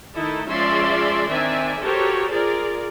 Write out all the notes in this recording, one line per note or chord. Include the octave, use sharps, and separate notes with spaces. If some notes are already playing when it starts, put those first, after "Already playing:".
D#3 A3 D#4 E4 A4
F3 G#3 C#4 D5 E5 C6
D#3 C4 D4 D5 E5 G#5
F#4 G4 A4 A#4 C5 C#5
F4 G#4 A#4 D5